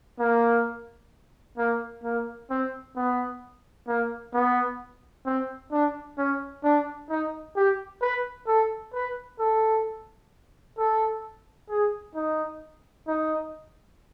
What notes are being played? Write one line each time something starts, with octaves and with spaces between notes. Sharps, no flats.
A#3
A#3
A#3
C4
B3
A#3
B3
C4
D4
C#4
D4
D#4
G4
B4
A4
B4
A4
A4
G#4
D#4
D#4